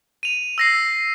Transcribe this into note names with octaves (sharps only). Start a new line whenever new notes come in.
D#7 F7
E6 A#6 C7